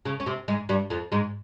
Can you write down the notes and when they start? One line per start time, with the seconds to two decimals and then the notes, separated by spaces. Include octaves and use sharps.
0.05 C#3 C#4
0.20 C#4
0.26 C3 C4
0.48 G#2 G#3
0.69 G2 G3
0.90 F2 F3
1.12 G#2 G#3